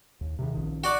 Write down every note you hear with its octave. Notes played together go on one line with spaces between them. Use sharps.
D#2
C3 D#3
A#1 D#3
F#4 D5